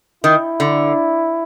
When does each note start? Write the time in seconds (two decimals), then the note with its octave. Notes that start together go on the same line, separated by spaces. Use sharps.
0.24 D#3 E4
0.60 D3